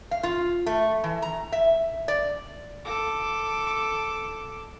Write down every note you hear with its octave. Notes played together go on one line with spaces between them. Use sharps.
F5
F4
A3
E3
A#5
E5
D5
A4 D6